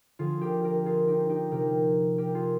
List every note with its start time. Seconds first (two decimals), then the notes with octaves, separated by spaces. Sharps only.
0.19 D3 F3 F4 G#4
0.41 G4 A#4
0.64 G4 A#4
0.85 F4 G#4
1.07 D#4 G4
1.29 D#4 G4
1.51 C3 F3 G4 A#4
2.18 G4 A#4
2.35 F4 G#4